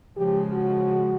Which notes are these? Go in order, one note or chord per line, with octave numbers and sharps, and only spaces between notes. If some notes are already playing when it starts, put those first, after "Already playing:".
C#3 F3 G#3 G4
F#4